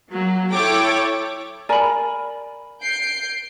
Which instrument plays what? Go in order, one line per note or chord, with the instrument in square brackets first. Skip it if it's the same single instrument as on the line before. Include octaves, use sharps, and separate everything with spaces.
[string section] F#3 A#3
E4 A4 C#5 G5 D6
[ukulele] A#4 G#5 A#5 [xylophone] D5 B5
[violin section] G6 C7 D7